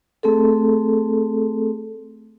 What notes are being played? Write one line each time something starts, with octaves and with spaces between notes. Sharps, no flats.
A3 C4 G#4 A4